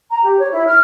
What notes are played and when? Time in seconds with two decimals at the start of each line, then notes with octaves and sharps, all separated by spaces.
0.10 A#5
0.25 G4
0.39 C#5
0.51 E4
0.67 F6